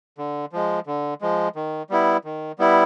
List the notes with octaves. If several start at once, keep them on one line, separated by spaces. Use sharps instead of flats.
D3
F3 G#3
D3
F3 G#3
D#3
G3 B3 E4
D#3
G3 B3 E4